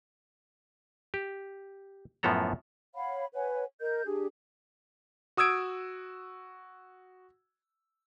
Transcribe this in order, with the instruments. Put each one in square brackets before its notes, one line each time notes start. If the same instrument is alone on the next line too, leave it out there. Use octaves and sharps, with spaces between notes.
[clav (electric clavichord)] G4
F#2 A2 F3 B3 A4 A#5
[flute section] C#5 F5 F#5 B5
B4 C#5 F#5 G#5
A#4 D#5 G6
D4 G4 G#4
[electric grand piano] F#4 D#6 E6 G#6 D7